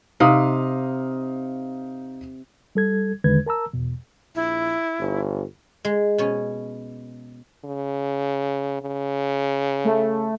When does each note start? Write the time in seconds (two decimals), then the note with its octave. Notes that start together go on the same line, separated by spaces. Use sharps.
0.20 C3 D#4 F5 D#6
2.75 G3 A4 G#6
3.24 E2 D3 D#3 G#3 B4 G#6
3.46 A#4 A5 A#5 E6
3.73 E2 B2
4.35 A#1 E4
4.99 G1
5.85 G#3
6.18 B2 C#4 C#5
7.65 C#3
8.82 C#3
9.85 A3